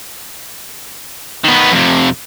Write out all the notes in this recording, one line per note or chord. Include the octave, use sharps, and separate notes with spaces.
D#3 B3
F2 C3